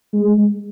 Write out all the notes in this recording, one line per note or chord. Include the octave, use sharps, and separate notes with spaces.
G#3